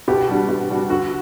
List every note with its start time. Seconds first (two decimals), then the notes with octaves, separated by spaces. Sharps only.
0.08 B2 G4
0.29 G3 D4 F#4
0.48 B2
0.70 G3 D4 F#4
0.90 D3 F#4